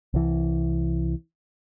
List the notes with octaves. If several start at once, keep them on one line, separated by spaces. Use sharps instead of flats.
C2 E3